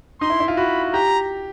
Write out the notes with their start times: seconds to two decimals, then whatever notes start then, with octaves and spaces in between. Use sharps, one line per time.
0.21 D#4 C6
0.30 E4
0.40 E4
0.48 F4
0.57 F#4 B5
0.93 G4 A#5